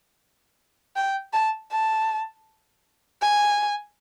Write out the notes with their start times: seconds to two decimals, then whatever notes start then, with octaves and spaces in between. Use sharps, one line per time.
0.96 G5
1.33 A5
1.72 A5
3.22 G#5